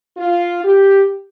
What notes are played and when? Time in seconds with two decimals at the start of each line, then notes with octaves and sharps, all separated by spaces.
0.17 F4
0.64 G4